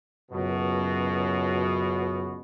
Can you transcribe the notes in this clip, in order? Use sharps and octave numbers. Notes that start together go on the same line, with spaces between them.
C#2 F#2 B2